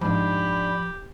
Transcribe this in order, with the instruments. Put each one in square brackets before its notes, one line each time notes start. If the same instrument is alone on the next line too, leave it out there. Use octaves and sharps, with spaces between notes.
[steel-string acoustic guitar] G#2 D4 [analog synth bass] F3 [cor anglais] G4 [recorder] B5